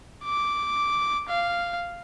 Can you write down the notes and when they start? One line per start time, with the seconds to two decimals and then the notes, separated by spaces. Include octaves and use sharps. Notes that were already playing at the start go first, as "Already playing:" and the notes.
0.24 D6
1.29 F5